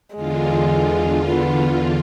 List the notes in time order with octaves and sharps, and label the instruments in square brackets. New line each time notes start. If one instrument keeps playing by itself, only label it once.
[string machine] E2 D3 F4 [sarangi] G#3
[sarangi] B3